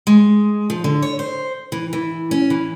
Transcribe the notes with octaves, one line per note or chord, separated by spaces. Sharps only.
G#3
F3
D3
C#5
C5
E3
E3
C#4
E3